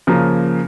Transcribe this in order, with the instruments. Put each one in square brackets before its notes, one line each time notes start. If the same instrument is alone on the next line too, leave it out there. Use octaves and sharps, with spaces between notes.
[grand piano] C#3 F3 A#3